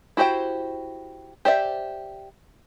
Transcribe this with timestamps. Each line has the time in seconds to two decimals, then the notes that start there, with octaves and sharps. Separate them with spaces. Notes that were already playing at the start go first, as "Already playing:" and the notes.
0.17 E4 F#4 G4 C5 G5
1.45 G4 C5 D5 E5